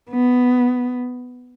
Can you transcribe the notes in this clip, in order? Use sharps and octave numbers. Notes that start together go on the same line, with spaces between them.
B3